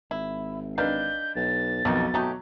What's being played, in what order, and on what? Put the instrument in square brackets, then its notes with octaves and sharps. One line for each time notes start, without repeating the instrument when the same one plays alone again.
[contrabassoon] G#1 [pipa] E4
[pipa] D#3 F5 [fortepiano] D4 B4 [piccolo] G6
[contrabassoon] B1 [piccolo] A6
[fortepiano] B1 F2 [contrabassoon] B2 [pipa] D#3 F3
[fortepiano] F#3 [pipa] A3 D#4 G4